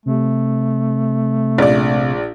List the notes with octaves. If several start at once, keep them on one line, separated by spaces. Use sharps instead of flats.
C3 A3
A#1 D5